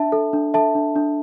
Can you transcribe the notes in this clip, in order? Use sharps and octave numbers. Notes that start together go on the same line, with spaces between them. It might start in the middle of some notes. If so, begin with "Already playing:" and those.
Already playing: D4 E5 A5
A4
D4
A4 E5 A5
D4
D4